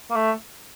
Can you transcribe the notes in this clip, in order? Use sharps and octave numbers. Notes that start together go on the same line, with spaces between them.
A#3
A3